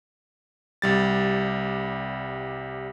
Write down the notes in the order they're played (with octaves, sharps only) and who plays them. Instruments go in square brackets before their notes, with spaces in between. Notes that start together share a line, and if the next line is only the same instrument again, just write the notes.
[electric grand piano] C2 G3 A6